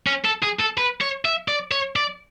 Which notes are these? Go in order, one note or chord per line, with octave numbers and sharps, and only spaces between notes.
C#4
A4
G#4
A4
B4
C#5
E5
D5
C#5
D5